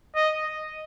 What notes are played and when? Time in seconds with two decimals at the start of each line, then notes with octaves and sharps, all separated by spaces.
0.15 D#5